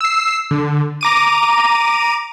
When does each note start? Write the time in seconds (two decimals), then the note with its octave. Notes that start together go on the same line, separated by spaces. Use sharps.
0.01 E6 C7
0.51 D3
1.01 A#5 D6 D#7